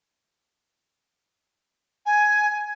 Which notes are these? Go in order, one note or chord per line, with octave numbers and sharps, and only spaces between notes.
G#5